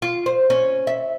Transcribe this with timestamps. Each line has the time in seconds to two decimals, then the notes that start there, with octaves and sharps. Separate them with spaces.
0.02 F4
0.26 C5
0.50 C#4
0.87 E5